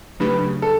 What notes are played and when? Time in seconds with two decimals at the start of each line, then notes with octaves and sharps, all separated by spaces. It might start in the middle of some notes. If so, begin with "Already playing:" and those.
0.20 C#3 F#3 A3 D4 G4 B4
0.62 A4